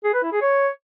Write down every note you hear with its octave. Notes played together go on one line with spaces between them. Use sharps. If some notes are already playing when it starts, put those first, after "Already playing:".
G#4
B4
E4
G#4
C#5